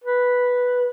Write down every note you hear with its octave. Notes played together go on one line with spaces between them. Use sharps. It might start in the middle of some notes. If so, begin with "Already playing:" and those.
B4